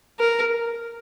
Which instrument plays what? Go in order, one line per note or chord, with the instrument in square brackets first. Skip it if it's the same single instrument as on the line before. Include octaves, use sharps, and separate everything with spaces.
[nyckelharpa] A#4